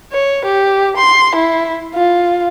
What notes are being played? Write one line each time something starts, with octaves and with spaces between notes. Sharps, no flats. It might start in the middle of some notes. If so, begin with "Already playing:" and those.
C#5
G4
C6
E4
F4